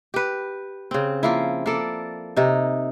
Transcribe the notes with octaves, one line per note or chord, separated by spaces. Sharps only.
G4 B4
C#3 C4
F3 A#3 E4
A#3 A4 D5
C3 D#4